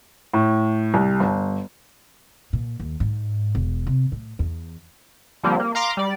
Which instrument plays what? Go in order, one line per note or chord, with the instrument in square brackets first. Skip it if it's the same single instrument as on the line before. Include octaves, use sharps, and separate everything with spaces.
[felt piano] A2
C2
G1
[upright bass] A#2
D#2
G#2
E1
C3
A2
E2
[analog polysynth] D3 F3 G3 A#3 C4
A#3
F5 A#5 C6 D6
G3 D5